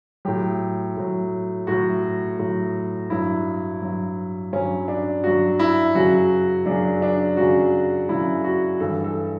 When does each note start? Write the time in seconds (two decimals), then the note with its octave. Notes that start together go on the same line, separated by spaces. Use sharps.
0.25 A2 F#3 G4
0.96 A2 F#3
1.67 A2 F#3 F#4
2.39 A2 F#3
3.10 G2 F#3 E4
3.82 G2 F#3
4.52 G2 F#3 C#4
4.88 D4
5.24 G2 F#3 F#4
5.59 E4
5.95 F#2 C#3 F#3 F#4
6.66 F#2 C#3 F#3 D4
7.02 D4
7.37 F#2 C#3 F#3 F#4
8.09 F#2 C#3 F#3 E4
8.44 F#4
8.80 G2 E3 G3 A4
9.04 A4